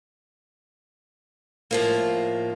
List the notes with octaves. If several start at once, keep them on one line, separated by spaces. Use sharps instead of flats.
A2 F3 A#3